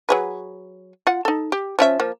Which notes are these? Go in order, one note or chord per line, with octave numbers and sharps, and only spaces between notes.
F#3 G#4 B4
F4 F#5
D#4 A4
G4
F3 C#4 E5
F3 A#3